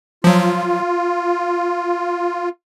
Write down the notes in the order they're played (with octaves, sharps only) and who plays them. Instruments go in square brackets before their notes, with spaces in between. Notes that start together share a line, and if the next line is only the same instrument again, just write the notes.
[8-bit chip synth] F3 F#3 [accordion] F4